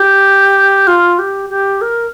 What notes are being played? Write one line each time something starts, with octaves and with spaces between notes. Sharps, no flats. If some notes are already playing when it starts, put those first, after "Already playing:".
Already playing: G4
F4
G4
G4
A#4